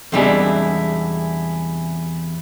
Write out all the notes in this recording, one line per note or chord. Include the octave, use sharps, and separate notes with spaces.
E2 C3 G3 G#3 D4 E4